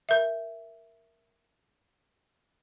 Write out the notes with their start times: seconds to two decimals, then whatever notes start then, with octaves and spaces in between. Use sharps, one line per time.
0.09 A#4 E5